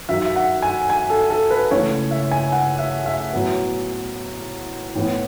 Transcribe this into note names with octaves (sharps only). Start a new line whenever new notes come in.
F#2 D#3 F#3 E5
E5
F#5
G#5
G#5
A4
A4
B4
C#2 C#3 E3 A3 C#5
E5
G#5
F#5
E5
E5
A2 F#3 B3
A2 E3 B3